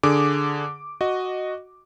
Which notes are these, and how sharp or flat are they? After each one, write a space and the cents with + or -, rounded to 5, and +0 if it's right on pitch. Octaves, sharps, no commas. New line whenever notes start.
D3 +0 G#4 +0 D6 +0
F#4 +0 D#5 -5